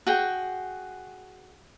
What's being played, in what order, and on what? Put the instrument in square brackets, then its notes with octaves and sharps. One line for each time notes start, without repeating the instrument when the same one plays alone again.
[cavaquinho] F#4 G#4 G5